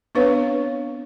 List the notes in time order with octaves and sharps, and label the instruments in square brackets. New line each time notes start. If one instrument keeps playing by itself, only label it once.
[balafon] B3 C4 D4 B4 C#5 F5